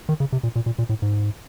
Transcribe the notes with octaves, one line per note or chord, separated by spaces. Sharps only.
D#3
C#3
C3
A#2
A#2
A#2
A#2
A2
G#2